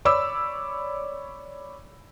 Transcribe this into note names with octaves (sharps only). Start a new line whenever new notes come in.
C#5 D5 B5 D6 E6